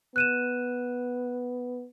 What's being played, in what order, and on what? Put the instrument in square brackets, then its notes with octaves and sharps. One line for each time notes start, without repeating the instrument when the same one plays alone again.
[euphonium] B3 [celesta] F#6 D#7 E7